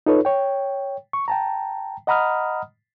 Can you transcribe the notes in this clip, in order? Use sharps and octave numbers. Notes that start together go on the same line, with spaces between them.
D#4 F4 A4 B4 C#5
C#5 G5
C#6
G5 A5 A#5
D#5 F#5 A#5 B5 D#6 F6